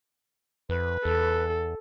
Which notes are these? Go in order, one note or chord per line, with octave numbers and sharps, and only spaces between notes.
F2 B4
E2 A4